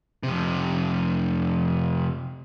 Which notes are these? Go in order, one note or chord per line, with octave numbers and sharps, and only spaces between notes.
F2 C3